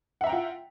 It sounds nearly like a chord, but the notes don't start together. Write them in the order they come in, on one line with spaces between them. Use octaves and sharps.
F#5 E5 A#5 G5 F4